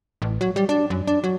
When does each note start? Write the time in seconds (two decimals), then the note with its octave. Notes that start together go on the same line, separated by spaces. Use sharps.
0.22 A1
0.41 F#3
0.56 G3
0.69 D4
0.90 F#2
1.07 D4
1.24 F#3